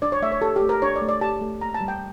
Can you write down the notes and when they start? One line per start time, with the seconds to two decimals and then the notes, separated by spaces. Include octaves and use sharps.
0.02 D4 D5
0.12 C#5
0.22 A3 E5
0.32 C#5
0.42 G4 A4
0.56 G4
0.62 A3
0.69 A#4
0.82 D4 C#5
0.96 D5
1.01 A3
1.09 D5
1.21 G4 A5
1.41 A3
1.61 A#3 A#5
1.74 A5
1.81 G3
1.88 G5